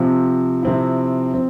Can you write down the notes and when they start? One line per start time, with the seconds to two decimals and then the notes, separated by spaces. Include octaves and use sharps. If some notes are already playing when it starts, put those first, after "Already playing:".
Already playing: C3 F3 C4 F4
0.63 C3 F3 C4 E4
1.34 F3 C4